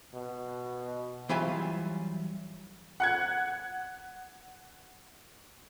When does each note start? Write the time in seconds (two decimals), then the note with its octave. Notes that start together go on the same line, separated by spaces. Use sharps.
0.14 B2
1.29 E3 F#3 G3 F4 E5 G#5
3.00 F#5 F#6 G#6